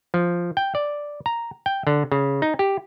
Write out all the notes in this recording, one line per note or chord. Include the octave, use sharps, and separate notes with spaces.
F3
G5
D5
A#5
G5
D3
C#3
D#4
G4